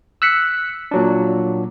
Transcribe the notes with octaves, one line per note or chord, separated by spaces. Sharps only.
E6 F#6 B6 C#7
A#2 F#3 D4